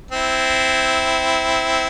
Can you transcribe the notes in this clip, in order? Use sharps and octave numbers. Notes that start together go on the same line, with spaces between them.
C4 E4